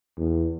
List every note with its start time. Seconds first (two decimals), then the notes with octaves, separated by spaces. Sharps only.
0.17 E2